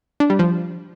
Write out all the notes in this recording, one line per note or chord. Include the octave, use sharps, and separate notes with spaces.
D4
G3
F3